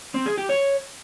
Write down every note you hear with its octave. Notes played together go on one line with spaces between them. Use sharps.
C4
G#4
G4
C#5